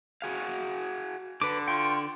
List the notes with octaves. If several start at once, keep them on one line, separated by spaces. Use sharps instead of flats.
F#4 G#4 F5
D3 B4 D6
F4 G5 C#6